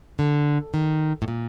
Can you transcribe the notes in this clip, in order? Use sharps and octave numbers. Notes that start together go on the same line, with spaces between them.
D3
D#3
A2
A#2